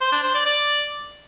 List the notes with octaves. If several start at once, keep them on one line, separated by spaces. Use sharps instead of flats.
C5
D4
C5
D5
D5